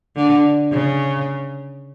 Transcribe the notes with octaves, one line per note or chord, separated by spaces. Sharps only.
D3
C#3